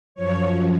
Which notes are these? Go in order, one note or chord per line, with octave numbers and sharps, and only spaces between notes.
F#2 F3 C#5